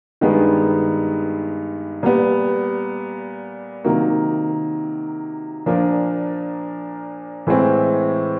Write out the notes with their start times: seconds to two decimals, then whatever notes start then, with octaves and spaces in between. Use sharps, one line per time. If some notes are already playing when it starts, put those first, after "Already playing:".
0.21 G2 D#3 G#3 B3
2.03 A#2 G3 B3
3.84 C3 D#3 F#3 A#3
5.66 A#2 F3 A#3 D4
7.47 A2 E3 G#3 C4